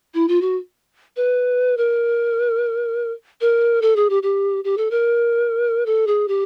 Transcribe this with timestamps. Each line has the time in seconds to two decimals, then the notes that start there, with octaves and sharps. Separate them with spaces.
0.14 E4
0.28 F4
0.41 F#4
1.17 B4
1.77 A#4
3.41 A#4
3.82 A4
3.96 G#4
4.10 G4
4.23 G4
4.64 G4
4.77 A4
4.91 A#4
5.86 A4
6.07 G#4
6.28 G4